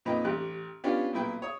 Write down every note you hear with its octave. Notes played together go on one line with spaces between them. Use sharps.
F2 A#2 D#4 B4 G5
A1 G4 F#6
B3 C#4 D4 F4 G4
B1 A#2 E4 B4 G5
C#5 D#6